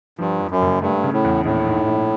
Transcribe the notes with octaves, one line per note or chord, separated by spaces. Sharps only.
G2 F3
F2
F#2
F#1
G2 A3
C#3
A2
E2
A#1 A2
G#2
A#1